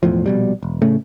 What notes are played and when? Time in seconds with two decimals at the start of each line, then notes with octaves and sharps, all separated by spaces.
0.03 E1 E2 A2 F3
0.26 A#1 B2 G3
0.63 E1
0.82 A2 C#3 A3